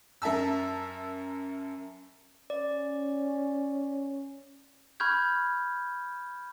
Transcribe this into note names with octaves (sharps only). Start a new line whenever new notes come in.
F#2 A#4 E5 A5 E6
C#4 D5
B5 C#6 F6 G6 G#6